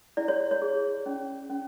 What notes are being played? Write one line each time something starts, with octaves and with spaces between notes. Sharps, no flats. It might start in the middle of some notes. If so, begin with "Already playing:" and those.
E4 D5
C#5
C#5
G#4
C#4
C#4